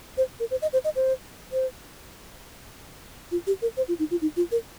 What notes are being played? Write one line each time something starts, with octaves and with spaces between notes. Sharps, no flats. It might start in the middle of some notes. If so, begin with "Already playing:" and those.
C5
A#4
C5
D#5
C5
D#5
C5
C5
F4
G4
A#4
C5
F4
D#4
F4
D#4
F4
A#4